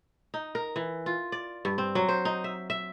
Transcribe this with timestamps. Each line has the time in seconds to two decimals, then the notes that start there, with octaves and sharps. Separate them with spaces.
0.34 D#4
0.55 A#4
0.76 E3
1.06 F4
1.32 D5
1.65 G2
1.78 C4
1.95 F#3
2.08 C5
2.25 D#4
2.44 E5
2.70 E5